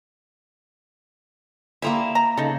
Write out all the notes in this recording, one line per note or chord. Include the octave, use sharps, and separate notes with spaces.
F3 G3 A#3 E4 A#4 E5
A#5
C#3 D#4 A4